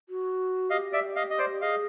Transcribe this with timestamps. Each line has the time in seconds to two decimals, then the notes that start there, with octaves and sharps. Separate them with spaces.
0.09 F#4
0.70 G4 D#5 F5
0.93 D5 E5
1.16 D#5 F5
1.30 D#5
1.39 C5 D5
1.61 G#4 D#5 F5